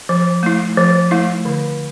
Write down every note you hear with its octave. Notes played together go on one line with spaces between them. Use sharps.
F3
A3 E4
F3
A3 E4
D3